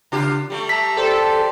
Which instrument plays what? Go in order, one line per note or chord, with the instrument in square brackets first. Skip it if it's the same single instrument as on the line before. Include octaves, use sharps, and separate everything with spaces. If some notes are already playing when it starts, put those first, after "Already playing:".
[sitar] C#3 F4 G4
G3 A3
[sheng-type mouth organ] E5 A5 A#5 [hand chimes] B6
[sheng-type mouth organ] G4 C5 D5 [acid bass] A4